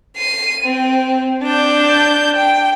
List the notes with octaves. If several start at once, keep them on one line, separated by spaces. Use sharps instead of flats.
C7 D#7
C4
D4 G6
G5